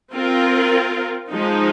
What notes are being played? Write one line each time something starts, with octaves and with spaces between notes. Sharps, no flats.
C4 F4 A#4
F3 G#3 D#4